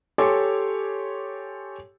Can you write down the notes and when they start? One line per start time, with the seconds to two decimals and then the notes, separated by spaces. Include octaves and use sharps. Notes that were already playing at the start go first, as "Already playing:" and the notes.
0.18 G4 A4 C#5 G#5 C6 D6